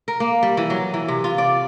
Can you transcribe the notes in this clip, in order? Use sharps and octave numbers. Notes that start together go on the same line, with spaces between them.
A#4
A#3
G3
E3
F#3
E3
C3
F4
D5